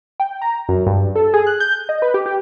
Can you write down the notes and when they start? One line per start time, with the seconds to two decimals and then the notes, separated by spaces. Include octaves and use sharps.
0.20 G5
0.42 A#5
0.69 F#2
0.86 G2
1.16 A4
1.34 G#4
1.47 F#6
1.60 G6
1.89 D#5
2.02 B4
2.14 G4
2.26 G4